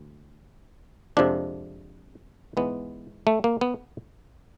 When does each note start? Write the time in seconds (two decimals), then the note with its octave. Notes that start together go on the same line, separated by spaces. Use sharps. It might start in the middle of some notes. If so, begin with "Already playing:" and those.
Already playing: D2
1.17 F2 C3 F3 G#3 D4
2.57 G#2 E3 G#3 B3
3.27 A3
3.44 A#3
3.61 B3